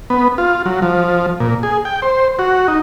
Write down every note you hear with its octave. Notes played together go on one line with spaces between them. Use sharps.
B3
F4
F#3
F3
A#2
G#4
G5
C5
F#4
D#4